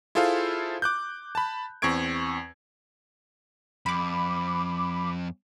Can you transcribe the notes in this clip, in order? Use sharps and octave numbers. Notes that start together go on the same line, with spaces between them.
E4 F4 G#4 A4 C5 F5
D6 F#6 G6
A5 B5
E2 C4 C#6 G#6 D7
F2 B5 D6